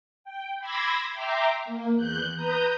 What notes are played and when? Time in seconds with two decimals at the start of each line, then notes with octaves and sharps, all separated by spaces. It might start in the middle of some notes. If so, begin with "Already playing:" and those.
0.24 G5
0.59 B5 C6 D6 E6 G#6 A#6
1.13 E5 G5 A#5 C6 D6
1.65 A#3
1.95 E2 F#6 G6
2.36 B4 A#5 D#6 G6